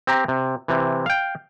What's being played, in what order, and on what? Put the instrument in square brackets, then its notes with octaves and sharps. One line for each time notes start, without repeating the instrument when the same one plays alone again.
[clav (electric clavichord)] C4 G4 A#5
C3
C3 E3
F5 G5